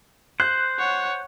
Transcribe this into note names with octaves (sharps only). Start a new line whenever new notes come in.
C5 F#6
C#5 F#5